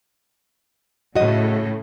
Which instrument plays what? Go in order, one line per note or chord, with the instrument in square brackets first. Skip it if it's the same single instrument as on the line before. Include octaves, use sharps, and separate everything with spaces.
[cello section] A2 C#3 [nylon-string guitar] F#4 D#5